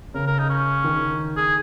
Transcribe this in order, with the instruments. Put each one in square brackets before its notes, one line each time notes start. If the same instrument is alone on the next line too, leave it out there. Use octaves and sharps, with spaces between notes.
[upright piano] C#3 [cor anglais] A#4
[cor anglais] A#4
D#4
C#4
[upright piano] D#3
[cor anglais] G#4